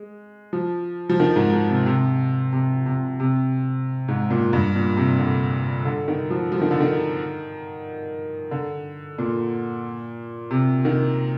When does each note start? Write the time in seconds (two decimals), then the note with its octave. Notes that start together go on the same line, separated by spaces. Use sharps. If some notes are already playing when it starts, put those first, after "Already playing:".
Already playing: G#3
0.53 F3
1.09 F3
1.20 D#3
1.36 G#2
1.53 G#2
1.69 C3
1.86 C3
2.53 C3
2.86 C3
3.20 C3
4.08 G#2
4.30 A#2
4.53 G2
4.75 A#2
4.97 C3
5.19 D3
5.85 D3
6.08 D#3
6.30 F3
6.52 F3
6.61 D#3
6.71 D3
6.80 D#3
8.51 D3
9.18 A#2
10.51 C3
10.85 D#3